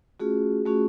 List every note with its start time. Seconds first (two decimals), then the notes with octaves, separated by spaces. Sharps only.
0.20 A3 C#4 F4 F#4 G#4
0.66 A3 C#4 F4 F#4 G#4